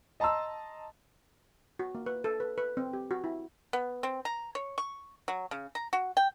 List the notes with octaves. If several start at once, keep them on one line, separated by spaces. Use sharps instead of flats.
D#5 A5 A#5 C6 E6
F#4
A#3
B4
A4
B4
B4
C4
G4
F#4
E4
B3
C4
A#5
C#5
C#6
F#3
C#3
A#5
F#4
G5